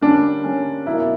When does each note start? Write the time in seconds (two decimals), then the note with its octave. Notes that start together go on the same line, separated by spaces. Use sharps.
0.01 D3 G3 A#3 C#4 D4
0.44 D3 G3 A#3 C#4
0.86 B2 F#3 A#3 D#4 E4